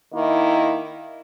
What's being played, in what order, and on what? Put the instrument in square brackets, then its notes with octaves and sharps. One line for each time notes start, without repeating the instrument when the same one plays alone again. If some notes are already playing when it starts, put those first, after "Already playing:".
[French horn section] D#3 A#3 E4